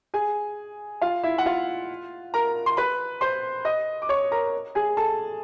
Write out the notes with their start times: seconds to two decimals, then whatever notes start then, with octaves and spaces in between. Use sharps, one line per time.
0.14 G#4 G#5
1.02 F4 F5
1.23 E4 E5
1.38 F#5
1.46 F4 F5
2.34 A#4 A#5
2.66 C6
2.77 B4 B5
3.21 C5 C6
3.65 D#5 D#6
4.02 D6
4.09 C#5 C#6
4.31 A#4 A#5
4.75 G#4 G#5
4.97 A4 A5